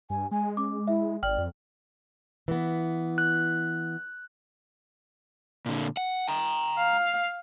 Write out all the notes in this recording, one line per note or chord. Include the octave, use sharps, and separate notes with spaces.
G2 G#5
G#3 G#5
C#4 D6
E4 E5
G#1 D5 G5 F6 F#7
F2
E3 B3
F#6
A#2 D3
F#5
G5 A#5
F5